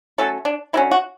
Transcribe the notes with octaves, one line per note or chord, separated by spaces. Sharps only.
F#3 A3 C#4 A4
D4
D3 F#3 C#4 E4
F#4